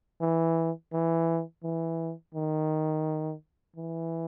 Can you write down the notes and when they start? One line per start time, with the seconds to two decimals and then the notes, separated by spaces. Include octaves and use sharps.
0.21 E3
0.93 E3
1.64 E3
2.34 D#3
3.76 E3